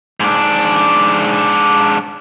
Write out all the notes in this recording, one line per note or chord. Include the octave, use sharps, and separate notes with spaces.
G#2 D4